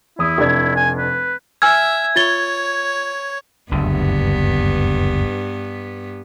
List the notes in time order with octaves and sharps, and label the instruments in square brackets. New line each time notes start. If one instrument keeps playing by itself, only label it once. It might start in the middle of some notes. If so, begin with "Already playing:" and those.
[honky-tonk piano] E2 D#6 [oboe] E4
[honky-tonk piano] F1 D4 G#6
[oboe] G#5
B4
[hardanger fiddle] E5 [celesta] G#5 E6 F6 [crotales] G#6
[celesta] F4 A6 G7 [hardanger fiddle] C#5
[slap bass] F#1 D2 D3 [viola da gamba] G2 B3